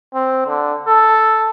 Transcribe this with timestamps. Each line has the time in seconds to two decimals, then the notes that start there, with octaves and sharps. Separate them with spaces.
0.14 C4
0.47 D3
0.88 A4